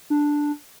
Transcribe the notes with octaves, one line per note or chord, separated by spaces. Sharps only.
D4